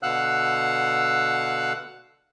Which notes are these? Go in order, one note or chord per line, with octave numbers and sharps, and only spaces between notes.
B2 D3 F5 F#5 E6 F#6